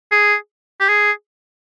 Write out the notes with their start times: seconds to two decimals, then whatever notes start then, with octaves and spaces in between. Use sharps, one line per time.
0.11 G#4
0.80 G4
0.88 G#4